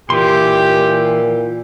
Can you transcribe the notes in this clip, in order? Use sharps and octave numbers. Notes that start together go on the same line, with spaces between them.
A#2 E3 G4 C6